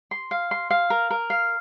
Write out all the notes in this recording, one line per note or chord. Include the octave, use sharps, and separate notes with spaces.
C6
F5
C6
F5
A#4
A#4
F5